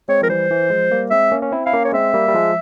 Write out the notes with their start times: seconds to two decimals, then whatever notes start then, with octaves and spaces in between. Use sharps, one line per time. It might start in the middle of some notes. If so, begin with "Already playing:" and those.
0.08 G#3 C4 C#5
0.22 F3 A#4
0.29 E3 G3 C5
0.51 E3
0.70 F3 G#3
0.91 G3 A#3
1.11 G#3 C4 E5
1.32 A#3 C#4
1.42 C#4
1.52 C4 E4
1.66 E4 F5
1.72 A#3 C#4
1.85 C#5
1.88 C#4
1.93 G#3 C4 E5
2.14 G3 A#3
2.28 G3
2.34 F3 G#3